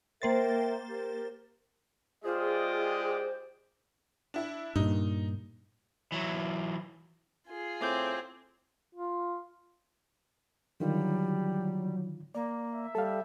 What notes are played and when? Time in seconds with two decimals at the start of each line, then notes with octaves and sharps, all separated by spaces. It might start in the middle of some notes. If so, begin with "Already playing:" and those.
0.22 A#3 A#4 C5 E5 G5 A6
0.89 G4 A#4
2.25 G#3 F4 G4 G#4 C5 D5 D#5
4.34 D4 E4
4.76 G2 A#2 D#4
6.12 E3 F#3
7.48 F4 G#4
7.81 A2 C4 G#5 D6 G6
8.95 F4
10.80 D3 D#3 F#3 G3 F4
12.35 A#3 D5
12.72 E5
12.95 G3 A4 F5